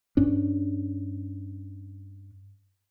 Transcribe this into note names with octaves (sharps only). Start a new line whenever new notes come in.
G2 C#4 D4